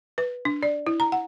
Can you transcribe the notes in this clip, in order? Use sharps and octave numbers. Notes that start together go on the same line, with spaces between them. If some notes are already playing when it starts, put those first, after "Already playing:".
B4
D4
D5
E4
A#5
F#5